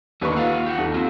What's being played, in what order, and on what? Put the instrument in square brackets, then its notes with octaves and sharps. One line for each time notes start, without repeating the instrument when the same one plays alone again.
[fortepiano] D#2 B4 C#6 [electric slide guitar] D3 A#3 D#5
[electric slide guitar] F4 F5 F#5
G4 F#5
[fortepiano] D#2 A4
[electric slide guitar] C4 F4